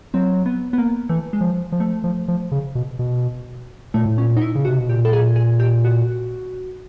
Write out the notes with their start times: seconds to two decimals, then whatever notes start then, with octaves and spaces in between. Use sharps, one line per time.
0.14 F#3 C4
0.46 B3
0.73 B3
0.78 A#3
1.09 E3 A3
1.33 G#3
1.41 F3
1.72 F3
1.80 A3
2.04 F3
2.28 F3
2.52 C#3
2.75 B2
2.99 B2
3.94 A#2 A3
4.06 A2
4.17 A#2 C#4
4.37 D#4
4.42 E4
4.55 C#3
4.65 C3 F#4
4.78 B2
4.89 A#2 G4
5.05 A4
5.13 G#4
5.36 G#4
5.60 G4
5.84 F#4